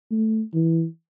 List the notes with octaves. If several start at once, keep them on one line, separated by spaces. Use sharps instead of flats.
A3
E3